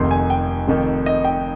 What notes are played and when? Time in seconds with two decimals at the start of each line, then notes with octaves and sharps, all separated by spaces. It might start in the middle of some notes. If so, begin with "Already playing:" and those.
Already playing: F1 F2 C3 D#3 C6
0.11 G#5
0.30 G5
0.68 F1 F2 D#3
1.06 D#5
1.25 G5